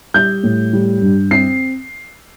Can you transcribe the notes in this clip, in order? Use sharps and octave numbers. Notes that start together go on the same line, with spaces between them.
G3 G6
A2
G3
G2
C4 C7